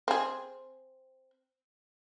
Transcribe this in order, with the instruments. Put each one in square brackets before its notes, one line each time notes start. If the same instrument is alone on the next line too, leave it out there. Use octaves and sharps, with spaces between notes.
[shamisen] C4 G#4